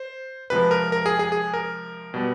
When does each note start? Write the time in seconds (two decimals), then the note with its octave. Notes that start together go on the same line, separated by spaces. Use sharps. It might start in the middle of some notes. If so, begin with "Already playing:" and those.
Already playing: C5
0.50 C3 F3 G#3 B4
0.71 A#4
0.92 A#4
1.06 G#4
1.19 G#4
1.32 G#4
1.54 A#4
2.14 B2 G3 B3